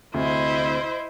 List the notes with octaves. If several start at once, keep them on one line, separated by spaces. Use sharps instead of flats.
D2 C3 E4 C5 D#5